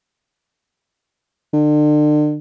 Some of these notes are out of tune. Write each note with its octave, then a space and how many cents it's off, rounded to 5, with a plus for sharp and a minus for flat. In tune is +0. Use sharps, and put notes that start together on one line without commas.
D3 +35